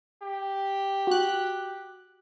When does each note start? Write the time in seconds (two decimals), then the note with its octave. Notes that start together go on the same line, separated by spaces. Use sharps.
0.23 G4
1.07 F#4 F#6